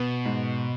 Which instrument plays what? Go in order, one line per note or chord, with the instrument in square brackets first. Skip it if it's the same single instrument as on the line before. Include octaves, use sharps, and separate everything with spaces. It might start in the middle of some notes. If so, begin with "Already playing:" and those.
Already playing: [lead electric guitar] B2 [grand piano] B3
[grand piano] G#2